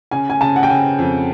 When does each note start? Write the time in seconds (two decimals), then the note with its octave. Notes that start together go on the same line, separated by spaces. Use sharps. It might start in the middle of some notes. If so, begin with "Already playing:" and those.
0.11 C#3 G#5
0.30 G#5
0.41 C#3 A5
0.56 F#5
0.63 G5
0.70 C#3 G#5
0.99 F2